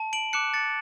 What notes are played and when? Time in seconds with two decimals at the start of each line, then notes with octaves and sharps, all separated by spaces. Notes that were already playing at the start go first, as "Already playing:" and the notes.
Already playing: A5
0.13 D7 F#7
0.33 D6 F#6 C#7 E7
0.54 A6 C#7